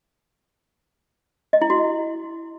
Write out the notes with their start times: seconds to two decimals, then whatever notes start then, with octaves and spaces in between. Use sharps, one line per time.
1.53 D#5
1.61 E4
1.70 F#4